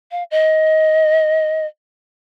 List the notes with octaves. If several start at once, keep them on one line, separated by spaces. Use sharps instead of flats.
F5
D#5